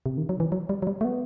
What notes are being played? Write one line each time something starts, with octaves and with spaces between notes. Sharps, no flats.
C3
D#3
F#3
E3
F#3
G3
F#3
G3
A3
B3